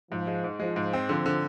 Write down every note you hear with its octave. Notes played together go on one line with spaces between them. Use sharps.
G#2 F3
G#3
G#2
F3 G#3
G#2
C4
D3 F3
D3